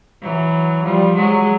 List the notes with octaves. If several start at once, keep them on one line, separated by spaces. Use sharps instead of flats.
E3 F#3
F3 G3
F#3 G#3